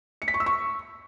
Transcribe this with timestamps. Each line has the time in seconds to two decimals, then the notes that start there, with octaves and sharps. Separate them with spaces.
0.22 C#7
0.28 B6
0.34 C#6
0.40 E6
0.46 C#6